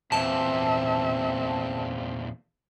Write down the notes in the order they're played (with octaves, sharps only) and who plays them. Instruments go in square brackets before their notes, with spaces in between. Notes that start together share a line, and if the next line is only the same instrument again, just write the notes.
[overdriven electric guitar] E2 A#2 [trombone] C4 [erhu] E5 [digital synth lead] A5